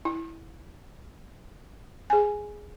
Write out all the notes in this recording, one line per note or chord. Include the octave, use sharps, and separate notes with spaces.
E4
G#4 G#5